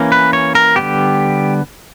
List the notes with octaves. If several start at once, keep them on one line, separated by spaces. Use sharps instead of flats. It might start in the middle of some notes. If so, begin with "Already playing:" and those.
Already playing: E3 A#3 C#4
B4
C#5
A#4
D3 G3 B3 G4